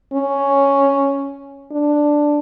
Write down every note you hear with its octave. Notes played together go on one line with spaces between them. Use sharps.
C#4
D4